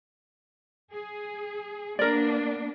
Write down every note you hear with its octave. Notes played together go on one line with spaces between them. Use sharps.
G#4
A#3 B3 D4 A#4 D5